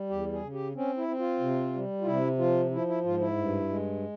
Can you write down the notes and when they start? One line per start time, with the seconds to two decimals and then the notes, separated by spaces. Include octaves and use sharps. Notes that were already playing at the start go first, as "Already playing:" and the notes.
Already playing: G3
0.09 E2 G4
0.32 G#4
0.42 C#3
0.53 G4
0.75 C4 C#4
0.97 E4
1.08 C4
1.19 F4
1.40 C3
1.74 G3
2.01 F4
2.05 C3 E4
2.38 F3 F4
2.71 F3 E4
2.88 E4
3.04 G#2 F4
3.20 E4
3.36 G2
3.69 G#3